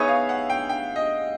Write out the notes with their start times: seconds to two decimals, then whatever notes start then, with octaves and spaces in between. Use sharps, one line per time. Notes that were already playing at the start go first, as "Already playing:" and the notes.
Already playing: B3 D#4 G#4 C#5 E5
0.08 F5
0.29 F#5
0.50 G5
0.69 G5
0.96 D#5